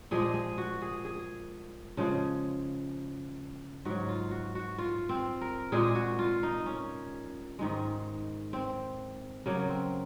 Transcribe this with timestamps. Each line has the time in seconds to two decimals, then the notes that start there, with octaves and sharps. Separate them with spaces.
0.11 A#2 F3 G#3 G#4
0.34 G#4
0.58 F#4
0.82 G#4
1.05 G#4
1.97 C#3 F3 G#3
3.85 G#2 F#3 F#4
4.09 F4
4.31 F#4
4.55 F#4
4.78 F4
5.09 C4
5.41 A#4
5.72 A#2 G#3 G#4
5.95 F#4
6.19 F4
6.43 D#4
6.66 C#4
7.59 G#2 D#3 G#3
8.53 C4
9.46 C#3 F#3 A#3
9.69 C4